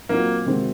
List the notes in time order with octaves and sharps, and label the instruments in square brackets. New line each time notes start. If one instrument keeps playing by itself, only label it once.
[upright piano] A#2 F#3 C4 D#4 [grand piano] A#3
[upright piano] C3 D#3 G#3 C4 F#4